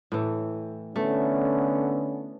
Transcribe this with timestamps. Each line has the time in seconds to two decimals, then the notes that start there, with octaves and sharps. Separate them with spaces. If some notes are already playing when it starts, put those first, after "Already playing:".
0.12 A2 E3
0.96 D3 A3 B3 C#4